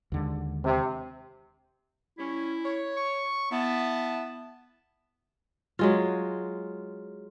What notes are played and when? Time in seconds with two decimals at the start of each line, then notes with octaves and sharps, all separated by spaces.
0.12 D#2 D3 G#3
0.64 C3
2.18 G3 C#4 E4
2.63 C#5
2.96 C#6
3.52 B3 E4 A5
5.79 F#3 G#3 F4